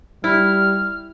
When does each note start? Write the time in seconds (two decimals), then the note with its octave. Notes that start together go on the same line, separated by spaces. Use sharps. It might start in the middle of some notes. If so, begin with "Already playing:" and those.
0.24 G3 E4 F6